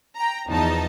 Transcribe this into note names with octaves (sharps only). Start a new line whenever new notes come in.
G5 A#5
E2 F3 D#4 A5